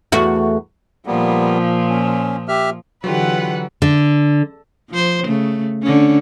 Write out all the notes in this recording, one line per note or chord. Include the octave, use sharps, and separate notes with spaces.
E2 A3 F#4
A#2 F3 G3 A#3 B3
C#4
G4 E5 F6
D3 E3 F#3 F4 G4 B4 F#5
D3
F3 C5
C#3 A3
D3 C#4